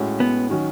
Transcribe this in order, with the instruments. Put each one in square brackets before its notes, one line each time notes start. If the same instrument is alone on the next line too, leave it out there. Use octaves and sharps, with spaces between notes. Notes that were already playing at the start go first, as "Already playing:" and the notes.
Already playing: [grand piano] A2 G#3 C#4 F#4
[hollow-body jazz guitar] B3
[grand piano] D#3 F#3 C#4 F#4